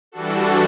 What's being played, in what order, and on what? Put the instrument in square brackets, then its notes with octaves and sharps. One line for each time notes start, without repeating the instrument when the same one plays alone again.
[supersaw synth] E3 G3 D4 F#4 A4